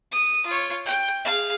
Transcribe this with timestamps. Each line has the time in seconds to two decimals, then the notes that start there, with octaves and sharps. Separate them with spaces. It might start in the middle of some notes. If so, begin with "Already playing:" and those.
0.11 D#6
0.46 F4 C#5
0.86 G5
1.25 G#4 F5